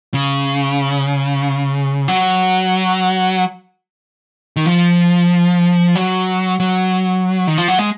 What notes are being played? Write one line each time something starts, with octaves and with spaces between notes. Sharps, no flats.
C#3
F#3
D#3
F3
F#3
F#3
D#3
F3
F#3
G#3